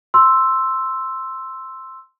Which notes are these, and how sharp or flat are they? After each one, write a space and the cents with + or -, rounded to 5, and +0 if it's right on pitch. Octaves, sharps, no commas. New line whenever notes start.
C6 +0 E6 +0